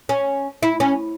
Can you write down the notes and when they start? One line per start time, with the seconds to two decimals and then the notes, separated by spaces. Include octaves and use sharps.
0.09 C#4
0.63 E4
0.80 C#4